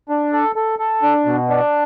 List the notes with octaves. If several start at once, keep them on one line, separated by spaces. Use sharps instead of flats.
D4
A4
A4
A4
D4
B2
D4